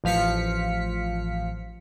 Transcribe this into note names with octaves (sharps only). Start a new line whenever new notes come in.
A1 F3 F5 B6 C#7